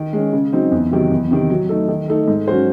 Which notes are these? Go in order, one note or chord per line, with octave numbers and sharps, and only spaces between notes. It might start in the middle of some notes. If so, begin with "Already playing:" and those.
Already playing: D#3
G#3 C#4
C#3
F#3 C4 D#4
E2
C3 D#3 F#3
E2
C3 D#3
F#3
A3 D#4 A4
D#3
A3 D#4 A4
G#2
F#3 C#4 F#4 C5